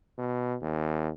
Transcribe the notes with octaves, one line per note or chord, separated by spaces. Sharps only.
B2
D#2